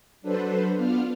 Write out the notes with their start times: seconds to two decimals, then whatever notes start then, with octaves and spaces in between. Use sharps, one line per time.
0.22 F#3 D4 A4 B4 C5
0.77 B3 D4 F4 F6